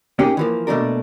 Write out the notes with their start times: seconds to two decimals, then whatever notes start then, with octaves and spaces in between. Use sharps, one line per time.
0.19 A#3 C#4 D#4 G4 G#4
0.37 E3 F3 A#3
0.67 B2 A3 A#3 D4 A#4